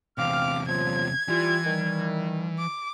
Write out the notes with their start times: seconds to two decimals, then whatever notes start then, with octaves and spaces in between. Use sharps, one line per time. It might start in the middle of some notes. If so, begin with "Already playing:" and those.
0.18 E2 C3 C4 F5 D6 F6
0.68 F3 F#3 F4 G#6
1.28 E3 G3 F4
1.65 D#3 G3
2.58 D6